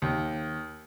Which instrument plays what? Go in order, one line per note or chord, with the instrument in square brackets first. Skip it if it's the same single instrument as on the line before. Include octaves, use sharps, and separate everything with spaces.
[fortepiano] D#2